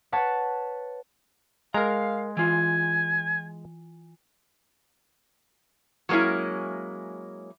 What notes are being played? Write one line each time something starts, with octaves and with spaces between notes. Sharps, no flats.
B4 C#5 F#5 A5
G#3 A#4 F5 A#5
E3 F4 G#5
F#3 G#3 A#3 C#4 E4